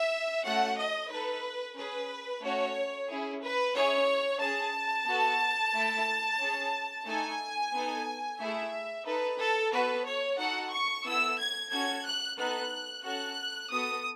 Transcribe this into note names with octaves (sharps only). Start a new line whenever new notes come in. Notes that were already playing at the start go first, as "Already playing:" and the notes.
Already playing: E5
A3 C#4 F#4 A4 F#5
D#5
D#4 A4 B4
C#4 G#4 B4
A3 C#4 F#4 A4 C#5
C#4 E4 G#4
B4
C#4 E4 G#4 C#5
C#4 G#4 A5
B3 F#4 A4
A3 E4 A4
C#4 G#4
A3 D#4 A4 G#5
B3 D#4 A4
A3 E4 G#4 E5
D#4 A4 B4
A4
B3 F#4 A4 B4
C#5
D#4 F#4 A4 F#5
C#6
B3 E4 A4 E6
G#6
C#4 F#4 A4 G#6
F#6
B3 D#4 A4 F#6
C#4 F#4 A4 F#6
B3 F#4 A4 D#6